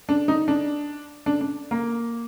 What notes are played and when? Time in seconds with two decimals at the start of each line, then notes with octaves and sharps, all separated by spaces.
0.09 D4
0.28 D#4
0.48 D4
1.26 D4
1.41 D4
1.71 A#3